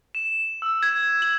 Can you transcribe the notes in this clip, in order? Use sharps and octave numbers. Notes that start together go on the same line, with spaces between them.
E7
E6
G#6
F#7